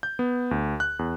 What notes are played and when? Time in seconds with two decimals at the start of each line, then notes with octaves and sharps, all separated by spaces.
0.03 G6
0.19 B3
0.51 D2
0.80 F#6
0.99 E2